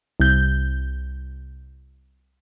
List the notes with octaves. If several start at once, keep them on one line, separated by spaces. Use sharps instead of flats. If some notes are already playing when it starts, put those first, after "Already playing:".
C2 G6